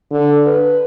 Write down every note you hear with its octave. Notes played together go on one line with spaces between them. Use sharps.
D3
B4